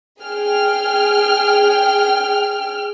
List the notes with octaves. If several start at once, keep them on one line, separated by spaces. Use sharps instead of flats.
G#4 G5 F6